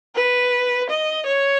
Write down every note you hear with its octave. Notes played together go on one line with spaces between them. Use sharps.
B4
D#5
C#5